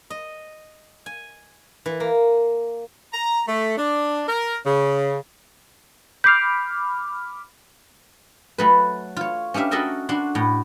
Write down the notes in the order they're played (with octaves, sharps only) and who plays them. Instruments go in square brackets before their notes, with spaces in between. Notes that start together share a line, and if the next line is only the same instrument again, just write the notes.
[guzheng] D#5
G#5
E3
A#3
[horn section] A#5
A3
D4
A#4
C#3
[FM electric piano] B5 D6 F6 [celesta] G6 C7
[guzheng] F#3 A3 B4
F4 C#5
C#4 D4 G4 E5 F5
F#4 A4 A#4 D#5 E5 G5
D4 F#4 C6
A2